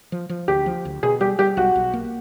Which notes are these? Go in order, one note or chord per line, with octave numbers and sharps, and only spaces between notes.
F3
F3
D2 G4
F3
D2
B2 G#4
G3 G4
G3 G4
B1 F#4
B1
A#3